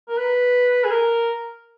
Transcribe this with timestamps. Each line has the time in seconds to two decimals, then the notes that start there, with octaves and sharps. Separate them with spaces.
0.09 A#4
0.17 B4
0.84 G#4
0.91 A#4